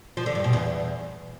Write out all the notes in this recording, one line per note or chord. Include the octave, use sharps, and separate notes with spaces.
F3
D3
G2
B2
E2